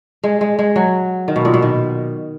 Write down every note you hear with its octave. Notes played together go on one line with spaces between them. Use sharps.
G#3
G#3
G#3
F#3
D#3
B2
A#2
B2
D#3